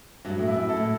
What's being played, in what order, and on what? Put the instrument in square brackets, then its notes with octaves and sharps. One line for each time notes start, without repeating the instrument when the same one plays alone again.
[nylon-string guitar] G2 [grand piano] F#3
[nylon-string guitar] A2
[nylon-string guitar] G2 [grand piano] E4
[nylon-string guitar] F#2
[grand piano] A4
[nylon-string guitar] A2